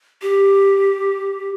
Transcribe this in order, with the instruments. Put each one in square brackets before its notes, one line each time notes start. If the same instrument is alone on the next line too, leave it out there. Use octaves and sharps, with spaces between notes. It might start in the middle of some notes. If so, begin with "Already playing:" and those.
[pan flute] G4